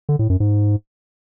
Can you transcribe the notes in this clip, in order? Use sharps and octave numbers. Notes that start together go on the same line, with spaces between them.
D3
A2
F#2
G#2